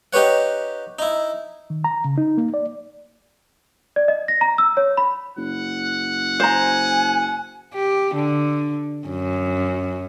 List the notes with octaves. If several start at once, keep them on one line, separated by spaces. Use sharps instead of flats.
D#4 G4 B4 C#5 F#5
D#4 E4
D#3
A#5
C#3
D#4
A#3
D5
D5
D#5
A#6
A#5
E6
C#5
B5
F#1 F#5
C5 G#5 A#5
G4
D3
F#2